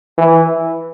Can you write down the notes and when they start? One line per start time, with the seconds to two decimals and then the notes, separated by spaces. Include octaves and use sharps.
0.18 E3